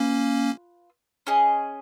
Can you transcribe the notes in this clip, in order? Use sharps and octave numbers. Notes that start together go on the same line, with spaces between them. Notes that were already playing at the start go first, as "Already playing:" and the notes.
Already playing: A#3 C#4 F4 B4
C#4 G#4 D#5